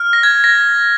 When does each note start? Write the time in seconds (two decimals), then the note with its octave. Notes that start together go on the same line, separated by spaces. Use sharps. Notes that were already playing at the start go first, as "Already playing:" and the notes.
Already playing: F6
0.13 A#6
0.23 G#6
0.44 A#6